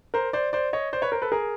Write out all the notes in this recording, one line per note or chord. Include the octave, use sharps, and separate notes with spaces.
A#4 C5
C5 D5
C5 D5
C#5 D#5
C5 D5
B4 C#5
A#4 C5
A4 B4
G#4 A#4